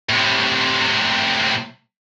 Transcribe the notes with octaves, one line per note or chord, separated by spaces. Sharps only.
A2 C3